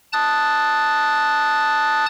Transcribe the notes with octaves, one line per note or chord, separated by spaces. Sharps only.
A5 D#6 F#6 A6